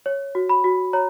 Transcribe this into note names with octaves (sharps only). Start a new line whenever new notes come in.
C#5
F#4
B5
F#4
C#5 A#5